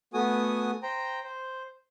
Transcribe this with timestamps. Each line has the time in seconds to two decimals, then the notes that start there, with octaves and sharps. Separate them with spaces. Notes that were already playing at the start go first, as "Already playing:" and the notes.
0.14 A3 B3 F#4 G#5 D#6
0.83 C5 G5 A#5
1.24 C5